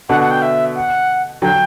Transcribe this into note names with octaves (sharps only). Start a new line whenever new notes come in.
B2 D3 F#5
F#5
G5
E5
F#5
D3 F#3 G5